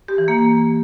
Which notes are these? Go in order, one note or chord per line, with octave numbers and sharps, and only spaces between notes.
G4
E3
A#3